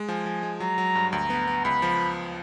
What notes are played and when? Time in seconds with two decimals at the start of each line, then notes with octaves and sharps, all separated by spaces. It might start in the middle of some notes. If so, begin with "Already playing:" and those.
Already playing: G#3
0.08 F3 G#5
0.26 F3
0.43 G#3
0.60 F#3 A#5
0.78 F#3
0.95 G2
1.13 D2 A#5
1.30 B3
1.47 B3
1.65 C#2 B5
1.82 F3